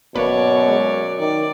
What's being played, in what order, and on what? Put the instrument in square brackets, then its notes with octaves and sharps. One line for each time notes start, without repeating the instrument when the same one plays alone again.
[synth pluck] G#1 A#3 B4 [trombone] F#2 [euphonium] B2 [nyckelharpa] C#5 D5
[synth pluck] G#3
[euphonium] D#3 [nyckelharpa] D5